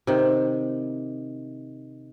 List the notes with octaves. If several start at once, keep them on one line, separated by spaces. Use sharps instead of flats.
C3 D#3